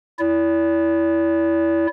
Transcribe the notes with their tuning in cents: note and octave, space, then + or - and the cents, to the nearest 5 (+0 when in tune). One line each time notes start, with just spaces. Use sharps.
E4 +0 D5 -40